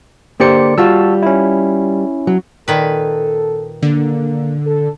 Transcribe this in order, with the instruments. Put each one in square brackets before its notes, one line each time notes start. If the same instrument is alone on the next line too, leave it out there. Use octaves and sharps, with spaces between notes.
[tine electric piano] D3 D5 C#7 [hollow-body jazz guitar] A#3 G4 C5
[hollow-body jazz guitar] G3 F4 [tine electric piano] F#4 A5 E6
[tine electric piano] C#4 E4
[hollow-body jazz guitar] F#3
[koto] A#2 D#3 B4 [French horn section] A4
[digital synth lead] D3 [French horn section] A#3
[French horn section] A4